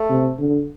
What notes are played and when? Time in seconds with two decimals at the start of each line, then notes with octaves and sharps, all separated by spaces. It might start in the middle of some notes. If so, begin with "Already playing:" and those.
Already playing: A3
0.09 C3
0.39 D3